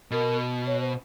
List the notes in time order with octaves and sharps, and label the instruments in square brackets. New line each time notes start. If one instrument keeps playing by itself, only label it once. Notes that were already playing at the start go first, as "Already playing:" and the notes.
[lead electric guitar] B2 [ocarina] A#4
[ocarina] C#5
C5